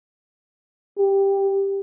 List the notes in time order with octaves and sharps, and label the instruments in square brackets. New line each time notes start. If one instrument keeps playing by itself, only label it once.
[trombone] G4